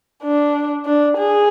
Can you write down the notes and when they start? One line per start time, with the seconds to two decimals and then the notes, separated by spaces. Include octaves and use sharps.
0.23 D4
0.86 D4
1.18 G#4